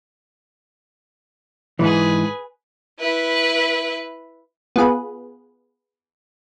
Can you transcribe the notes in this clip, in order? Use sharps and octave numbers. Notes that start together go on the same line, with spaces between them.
G#2 E3 G#4 B4
E4 B4
B3 F4 G#4 B4